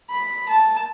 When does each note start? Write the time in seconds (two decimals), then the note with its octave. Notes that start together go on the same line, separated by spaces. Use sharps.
0.10 B5
0.49 A5